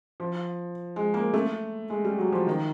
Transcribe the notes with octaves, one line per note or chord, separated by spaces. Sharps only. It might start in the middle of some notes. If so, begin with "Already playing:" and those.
F3
G#3
A#3
A3
G#3
G3
F#3
F3
D#3